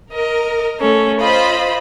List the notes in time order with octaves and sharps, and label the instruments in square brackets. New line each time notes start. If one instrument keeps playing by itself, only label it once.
[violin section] A#4 [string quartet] D#5
[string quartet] A3 C#4 A4
[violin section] F4 C5 B5 [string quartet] D#5